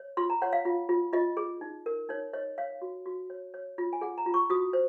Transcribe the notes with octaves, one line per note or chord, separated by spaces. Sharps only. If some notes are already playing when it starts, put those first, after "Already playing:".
Already playing: C#5
F4 C6
A#5
C#5 F#5
F5
F4
F4
F4 D#5
G#4
D#4
A#4
D#4 C#5
C#5 D#5
C#5 F5
F#4
F#4
C#5
C#5
F4
G#5
G#4 F#5
A#5
F4
C#6
F#4 D#6
C5